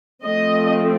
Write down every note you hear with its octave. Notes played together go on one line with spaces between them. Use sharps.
F3 A3 C4 D#5